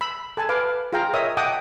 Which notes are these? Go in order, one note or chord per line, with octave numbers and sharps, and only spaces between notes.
B5 E6
A4 G#5 A5
B4 F5 D6
F4 G#4 F5 G5 A#5
A#4 C#5 D#5 E5 D#6
D#5 F#5 G5 A5 D6 D#6